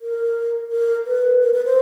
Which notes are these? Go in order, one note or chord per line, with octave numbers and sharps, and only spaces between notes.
A#4
A#4
B4
A#4
B4
C5